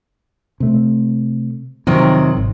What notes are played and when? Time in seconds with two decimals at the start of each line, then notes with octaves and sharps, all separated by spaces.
0.60 C3 A3
1.87 F2 C3 D#3 F#3
2.37 G#1